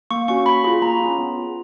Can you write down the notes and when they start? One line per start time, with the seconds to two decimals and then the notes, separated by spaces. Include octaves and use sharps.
0.11 A#3 C#6
0.28 C#4 F#4 C#6
0.46 A#3 B5
0.64 F4 G#4 B5
0.82 A#3 A#5
1.00 C#4 F4
1.18 B3
1.36 F4 G#4